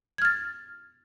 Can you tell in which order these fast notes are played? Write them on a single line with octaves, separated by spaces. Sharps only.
G#6 F6 A6